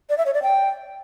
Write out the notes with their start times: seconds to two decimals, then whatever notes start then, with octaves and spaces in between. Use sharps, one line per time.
0.09 D5
0.18 E5
0.26 C#5
0.34 D5
0.43 G5